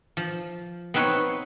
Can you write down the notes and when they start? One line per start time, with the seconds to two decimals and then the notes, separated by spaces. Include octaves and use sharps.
0.17 F3
0.94 B3 C4 D#4 B4 C#5